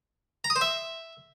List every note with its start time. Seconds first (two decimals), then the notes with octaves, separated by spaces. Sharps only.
0.44 A#5
0.50 D#6
0.56 C5
0.61 E5